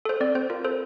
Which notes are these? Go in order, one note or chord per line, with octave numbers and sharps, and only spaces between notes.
A4 C5
C4 D5
C4 C5
F4 A#4
A4 C5